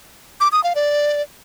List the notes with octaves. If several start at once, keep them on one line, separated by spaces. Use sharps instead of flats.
D6
D#6
F5
D5